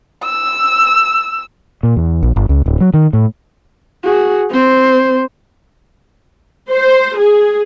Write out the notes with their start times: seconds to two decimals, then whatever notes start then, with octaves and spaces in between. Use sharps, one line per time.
0.24 E6
1.83 A#2
1.96 E2
2.23 A#1
2.36 G1
2.49 C#2
2.66 D1
2.81 F#3
2.94 D#3
3.13 A2
4.04 F#4 G#4
4.50 C4 C5
6.73 C5
7.19 G#4